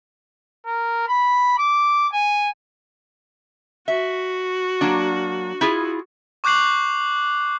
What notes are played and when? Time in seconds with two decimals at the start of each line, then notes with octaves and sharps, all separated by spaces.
0.66 A#4
1.08 B5
1.58 D6
2.12 G#5
3.88 F#4 E5
4.81 F#3 A#3 D4
5.61 E4 F4 G#4
6.44 C#6 D6 F#6 G6 C7 F#7